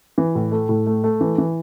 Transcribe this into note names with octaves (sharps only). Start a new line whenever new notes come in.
E3
A2
A3
A2
A3
A3
E3
E3